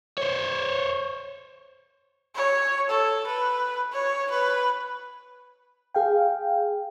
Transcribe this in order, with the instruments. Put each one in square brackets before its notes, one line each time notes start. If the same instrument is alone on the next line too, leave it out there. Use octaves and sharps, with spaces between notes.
[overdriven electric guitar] C5 C#5
[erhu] C#5
A4
B4
C#5
B4
[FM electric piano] G#4 F5 G5